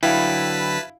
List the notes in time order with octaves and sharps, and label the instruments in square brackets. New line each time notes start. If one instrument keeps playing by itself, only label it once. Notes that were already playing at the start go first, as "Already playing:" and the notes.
[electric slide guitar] D3 F#3 G5 [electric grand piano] E4 F5 [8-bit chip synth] B4 A5 B6